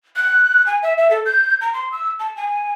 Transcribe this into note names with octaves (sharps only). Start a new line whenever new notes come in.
F#6
G#5
E5
E5
A4
G6
A#5
C6
E6
A5
G#5